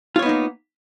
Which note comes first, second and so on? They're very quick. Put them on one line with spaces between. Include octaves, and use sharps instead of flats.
F4 C#5 B3 D#4 A#3